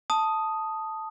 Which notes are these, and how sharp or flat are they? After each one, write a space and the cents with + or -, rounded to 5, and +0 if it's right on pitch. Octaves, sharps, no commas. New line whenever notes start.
A5 +0 D#6 +0